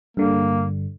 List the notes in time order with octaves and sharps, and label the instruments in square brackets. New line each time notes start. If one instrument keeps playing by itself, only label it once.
[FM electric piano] G2 D3 [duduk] A#3